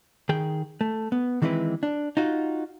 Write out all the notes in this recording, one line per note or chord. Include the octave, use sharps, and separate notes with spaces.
D#3 G#4 G5
A3
B3
D#3 E3 G#3 C4 E4 B4
D4
D#4 F4 F#4